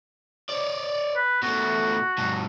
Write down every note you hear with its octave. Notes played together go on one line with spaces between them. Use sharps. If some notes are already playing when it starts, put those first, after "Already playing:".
C#5 D5
B4
B2 A3 F#4
G2 B2